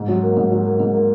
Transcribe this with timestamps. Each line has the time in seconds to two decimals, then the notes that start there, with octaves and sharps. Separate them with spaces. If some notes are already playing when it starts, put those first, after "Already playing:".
Already playing: G#2
0.08 F#3
0.23 A#3
0.37 G#2
0.51 F#3
0.65 A#3
0.80 G#2
0.94 A#3